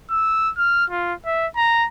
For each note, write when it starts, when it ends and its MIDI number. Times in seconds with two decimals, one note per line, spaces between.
0.11 0.51 88
0.57 0.85 89
0.90 1.14 65
1.26 1.47 76
1.56 1.87 82